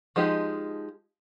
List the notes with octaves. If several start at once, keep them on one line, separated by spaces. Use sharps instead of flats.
F3 G#3 D#4 G4